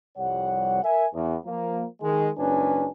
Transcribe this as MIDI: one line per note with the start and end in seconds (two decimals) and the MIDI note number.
0.17 0.80 36
0.17 0.80 41
0.17 0.80 55
0.17 0.80 73
0.17 0.80 78
0.83 1.06 70
0.83 1.06 76
0.83 1.06 80
1.14 1.36 40
1.45 1.85 53
1.45 1.85 58
2.01 2.29 51
2.01 2.29 56
2.38 2.89 30
2.38 2.89 44
2.38 2.89 61
2.38 2.89 62
2.38 2.89 71
2.38 2.89 80